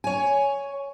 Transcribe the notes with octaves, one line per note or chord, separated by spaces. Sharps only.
C#5 G#5